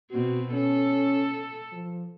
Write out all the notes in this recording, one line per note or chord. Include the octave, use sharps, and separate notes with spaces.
B2 C4 F#4
C#4 A4
F3